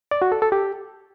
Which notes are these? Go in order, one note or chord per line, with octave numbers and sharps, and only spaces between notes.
D5
F#4
A4
A4
G4